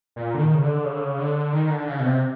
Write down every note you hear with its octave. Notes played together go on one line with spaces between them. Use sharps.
A#2
D3
D#3
C#3
D3
C#3
D3
C#3
D3
D#3
D3
C#3
B2
C3